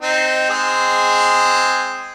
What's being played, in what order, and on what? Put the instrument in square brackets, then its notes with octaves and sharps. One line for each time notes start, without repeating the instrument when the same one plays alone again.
[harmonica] C4 D#4
G#3 C4 G#4